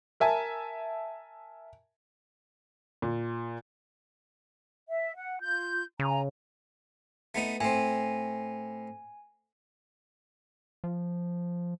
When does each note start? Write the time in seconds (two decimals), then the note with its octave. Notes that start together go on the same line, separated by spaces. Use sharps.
0.20 A#4 E5 G#5 A5
3.02 A#2
4.88 E5
5.16 F#5
5.40 F4 G6
6.00 C#3 G#5 A#5
7.35 A3 B3 D#4
7.61 A2 C4 G#5
10.84 F3